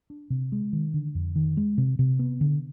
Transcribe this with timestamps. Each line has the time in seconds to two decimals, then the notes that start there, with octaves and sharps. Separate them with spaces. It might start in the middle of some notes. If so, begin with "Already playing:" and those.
0.10 D4
0.30 C3
0.52 G#3
0.73 D#3
0.94 D3
1.15 F2
1.36 D#3
1.57 G#3
1.78 C3
1.99 C3
2.19 B3
2.41 D3